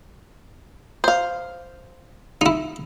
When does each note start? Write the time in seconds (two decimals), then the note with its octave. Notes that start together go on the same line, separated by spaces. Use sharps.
1.04 C5 F5
2.41 D#4 E4